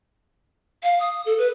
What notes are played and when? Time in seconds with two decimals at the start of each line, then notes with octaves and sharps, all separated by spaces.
0.83 F5
1.00 D#6
1.26 A4
1.38 B4